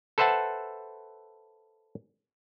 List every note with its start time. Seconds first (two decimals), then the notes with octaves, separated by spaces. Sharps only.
0.18 A4 B4 C5 E5 F#5 A5